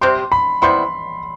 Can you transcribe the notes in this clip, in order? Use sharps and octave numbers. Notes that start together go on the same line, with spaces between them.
C3 G3 C4 G4 C6
B5
C3 G3 B3 E4 C6